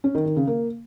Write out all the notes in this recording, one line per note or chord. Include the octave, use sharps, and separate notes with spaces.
C#4
D#3
D#3
C#3
A#3